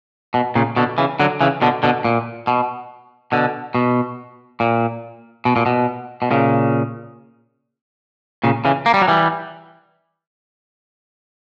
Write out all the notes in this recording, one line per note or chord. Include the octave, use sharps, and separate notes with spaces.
B2
A#2 C#3
B2 D3
C#3 E3
D3 F#3
C#3 E3
B2 D3
B2 D3
A#2
B2
B2 D3
B2
A#2
B2
A#2
B2
B2
A#2 C#3
A#2 C#3
C#3 E3
A#3
G3
F#3
E3 G3